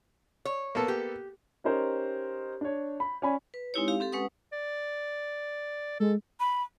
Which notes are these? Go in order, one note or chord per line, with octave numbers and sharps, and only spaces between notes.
C#5
A#3 B3 A4
G4
C#4 D#4 G4 A#4 C5 C#5
D4 C#5
B5
C#4 D5 G#5 B5
B4
G#3 C4 D#4 E4 G4 C#5
G4 F5
C4 G4 A4
G#3 C#4 B4 F#5 D#6
D5
G#3 A4
B5